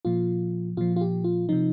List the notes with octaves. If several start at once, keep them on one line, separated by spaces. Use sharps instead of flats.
A#2 F3 F4
A#2 F3 F4
F4
G4
F4
C3 F3 D#4